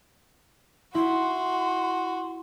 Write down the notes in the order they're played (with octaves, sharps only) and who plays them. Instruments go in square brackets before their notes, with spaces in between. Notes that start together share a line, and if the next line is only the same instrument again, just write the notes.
[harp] E4 [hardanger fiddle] F#4 [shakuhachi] C6